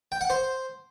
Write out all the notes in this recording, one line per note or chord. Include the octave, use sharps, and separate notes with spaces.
G5
F#5
C5